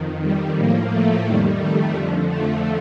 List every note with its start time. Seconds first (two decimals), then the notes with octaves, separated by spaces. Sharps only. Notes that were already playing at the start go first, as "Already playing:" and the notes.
Already playing: F2 D#3
0.22 G3
0.57 A2 F3 A#3
0.92 A3
1.26 F2 D#3 G3
1.60 A3
1.94 F2 D3 F3
2.30 A3